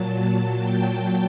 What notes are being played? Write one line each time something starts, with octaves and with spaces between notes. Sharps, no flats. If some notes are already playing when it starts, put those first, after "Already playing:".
Already playing: A#2 F#3 A5
G5